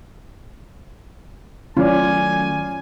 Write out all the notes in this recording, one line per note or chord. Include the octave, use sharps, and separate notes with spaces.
D#3 F#3 A3 C#4 F4 D5 G#5